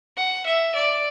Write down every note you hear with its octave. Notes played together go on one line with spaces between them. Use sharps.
F#5
E5
D5